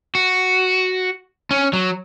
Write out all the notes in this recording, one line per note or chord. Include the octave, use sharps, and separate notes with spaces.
F#4
C#4
F#3